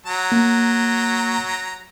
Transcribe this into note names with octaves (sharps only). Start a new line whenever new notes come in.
F#3 A#5
A#3